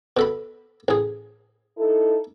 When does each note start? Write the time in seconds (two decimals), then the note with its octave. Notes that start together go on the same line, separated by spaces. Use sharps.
0.17 B2 A4 B5
0.88 A1 G#4
1.78 D#4 E4 A4